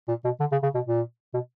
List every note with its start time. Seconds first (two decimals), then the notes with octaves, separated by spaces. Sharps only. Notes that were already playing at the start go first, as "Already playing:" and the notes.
0.08 A#2
0.25 B2
0.40 D3
0.51 C#3
0.63 C#3
0.75 B2
0.87 A#2
1.34 B2